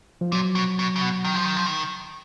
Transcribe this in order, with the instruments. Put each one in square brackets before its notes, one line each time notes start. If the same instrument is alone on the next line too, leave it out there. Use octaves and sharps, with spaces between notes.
[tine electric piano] F3
[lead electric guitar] A#2 [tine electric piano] F#3
[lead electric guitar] B2
B2
C#3
B2
D#3
F3
D#3
F3
D#3